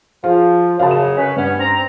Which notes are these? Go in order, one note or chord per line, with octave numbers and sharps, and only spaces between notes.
F3 F4 G#4
F#2 C#3 F5 A5
E7
C#4 B4
G2 B3 C#4
C4 A#5